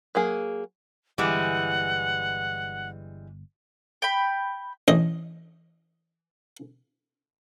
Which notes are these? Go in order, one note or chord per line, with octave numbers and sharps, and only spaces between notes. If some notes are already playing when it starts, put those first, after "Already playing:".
F#3 A#3 G#4
G1 E3 G3 G#3 F#5
G5 B5
A1 D#5